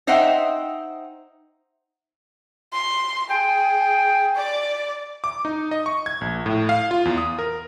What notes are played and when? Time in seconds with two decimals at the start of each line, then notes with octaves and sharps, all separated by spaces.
0.07 D#4 C5 D#5 E5 F#5 G5
2.73 C6
3.30 G#4 G5
4.35 D5
5.24 D6
5.45 D#4
5.71 D#5
5.86 C#6
6.06 G#6
6.21 A#1
6.46 A2
6.69 F5
6.91 F4
7.05 E2
7.18 D#6
7.39 A#4